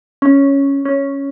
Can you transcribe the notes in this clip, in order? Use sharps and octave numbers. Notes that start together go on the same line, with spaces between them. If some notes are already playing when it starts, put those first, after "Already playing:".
C#4
C#4